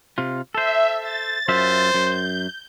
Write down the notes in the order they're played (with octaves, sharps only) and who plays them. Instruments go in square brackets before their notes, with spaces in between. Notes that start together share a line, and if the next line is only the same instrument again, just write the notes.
[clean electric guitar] C3 F4
[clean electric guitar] A4 C5 [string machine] E5
[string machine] A6
[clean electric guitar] F#2 F4 E5 [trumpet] C5
[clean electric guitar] F#2 [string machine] G6